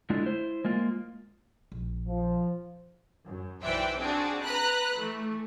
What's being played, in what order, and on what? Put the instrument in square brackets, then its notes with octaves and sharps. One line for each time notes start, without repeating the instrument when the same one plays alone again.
[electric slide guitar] D3 G#3 A3 D4 E4 F4
E4 C5
G#3 A#3 F4
[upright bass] A#1
[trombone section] F3
[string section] F#2
B1 E3 C5 D5 E5 G5
C4 D4 F#4 G#4
B4 A#5 B5 F#6
E3 A3